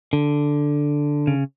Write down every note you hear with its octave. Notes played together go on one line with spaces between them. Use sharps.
D3
C#3